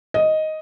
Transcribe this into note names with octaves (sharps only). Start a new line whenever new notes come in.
D#5